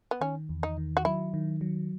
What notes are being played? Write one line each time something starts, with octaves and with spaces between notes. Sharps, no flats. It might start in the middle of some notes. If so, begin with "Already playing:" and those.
B3
D#3 C#4
E2
D#4
D#3
F#4
F#3 E4
D#3
F#3